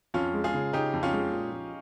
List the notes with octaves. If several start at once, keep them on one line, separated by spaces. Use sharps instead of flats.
F2 C#4 F4
G#3
F4 G#4
C#3
C#3 D#4 G4
F2
C#4 F4
G#3
A#2
F3